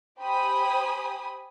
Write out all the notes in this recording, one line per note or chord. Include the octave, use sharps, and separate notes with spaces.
G4 C5 G5 G#5 B5 D#6